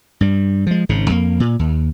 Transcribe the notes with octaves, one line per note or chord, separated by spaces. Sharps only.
G2 G3
F3 G#3
G#1 G#2 C#3
F2 A#3
A#2
D#2